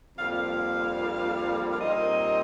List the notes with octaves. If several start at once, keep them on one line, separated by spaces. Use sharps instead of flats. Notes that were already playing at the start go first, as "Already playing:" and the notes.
F2 D3 G3 A#3 F5
F5
F5
A#2 G3 C4 D#4 D#5